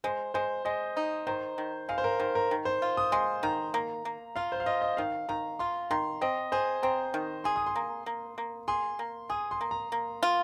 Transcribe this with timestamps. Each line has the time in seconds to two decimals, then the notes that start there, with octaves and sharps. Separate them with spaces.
0.04 G#3 C5
0.34 G#3 C5
0.65 G#3 D#5
0.97 D#4
1.27 D#3 C5
1.58 D#3
1.89 G#3 F5
1.98 C5
2.04 A#4
2.20 D#3 C5
2.35 A#4
2.51 D#3
2.65 C5
2.82 F4
2.97 D#6
3.12 G#3 C6
3.43 D#3 A#5
3.74 A#3
4.05 A#3
4.36 F4 F5
4.52 C5
4.60 F5
4.66 F4 D#5
4.82 D#5
4.97 D#3 F5
5.29 D#3 A#5
5.59 F4 C6
5.91 D#3 C6
6.21 C4 D#5
6.52 G#4 C5
6.83 C4 A#5
7.14 D#3
7.44 G#4 C6
7.56 D#6
7.66 C6
7.76 A#3
8.06 A#3
8.38 A#3
8.68 G#4 C6
8.99 A#3
9.30 G#4 D#6
9.51 C6
9.61 A#3
9.71 A#5
9.92 A#3
10.23 F4